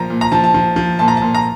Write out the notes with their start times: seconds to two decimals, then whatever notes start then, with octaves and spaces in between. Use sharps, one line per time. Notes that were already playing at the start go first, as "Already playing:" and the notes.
Already playing: A#2 F3 A#5
0.10 A#2
0.21 A#5
0.32 F3 A5
0.44 A5
0.54 F3
0.76 F3
0.99 A#2 A5
1.08 A#5
1.17 A#2 A5
1.35 A#5